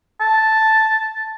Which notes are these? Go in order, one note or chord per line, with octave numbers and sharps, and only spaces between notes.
A5